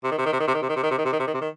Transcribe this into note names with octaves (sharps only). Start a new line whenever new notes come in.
C3
D#3
C3
D#3
C3
D#3
C3
D#3
C3
D#3
C3
D#3
C3
D#3
C3
D#3
C3
D#3
C3
D#3